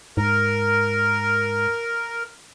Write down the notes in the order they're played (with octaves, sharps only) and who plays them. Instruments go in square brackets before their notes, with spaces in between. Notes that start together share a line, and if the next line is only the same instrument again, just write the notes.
[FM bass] G#2 [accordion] A#4